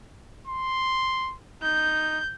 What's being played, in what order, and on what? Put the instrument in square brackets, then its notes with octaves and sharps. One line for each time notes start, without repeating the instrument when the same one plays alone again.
[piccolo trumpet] C6
[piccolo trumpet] D#4 [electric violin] G6